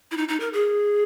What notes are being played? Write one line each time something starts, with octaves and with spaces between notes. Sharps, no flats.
E4
D#4
D#4
A#4
G#4